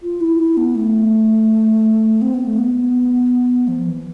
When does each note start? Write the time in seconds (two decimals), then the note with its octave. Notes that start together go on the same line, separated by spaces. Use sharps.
0.03 F4
0.21 E4
0.39 E4
0.57 B3
0.75 A3
2.22 C4
2.34 B3
2.46 A3
2.58 B3
3.68 F3
3.87 E3